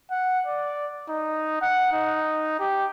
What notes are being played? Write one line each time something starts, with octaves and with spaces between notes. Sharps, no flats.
F#5
D5
D#4
F#5
D#4
G4